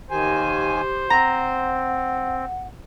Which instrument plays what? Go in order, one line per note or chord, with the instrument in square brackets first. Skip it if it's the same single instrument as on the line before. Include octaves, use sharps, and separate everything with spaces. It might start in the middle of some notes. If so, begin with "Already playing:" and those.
[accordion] D#2 D#3 G#5 [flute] G4 [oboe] C5
[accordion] C4 [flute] F#5 [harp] A#5